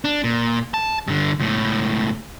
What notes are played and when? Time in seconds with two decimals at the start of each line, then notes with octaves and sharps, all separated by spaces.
0.05 D4
0.24 A#2
0.74 A5
1.08 G2 D3
1.39 C#2 A2